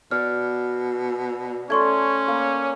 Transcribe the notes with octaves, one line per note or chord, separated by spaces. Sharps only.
B2 D5 F6
A3 C#4 D5 C6 C#6 G#6
A#3